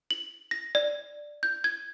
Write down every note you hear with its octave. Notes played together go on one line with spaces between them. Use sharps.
F#7
A#6
D5
G6
G#6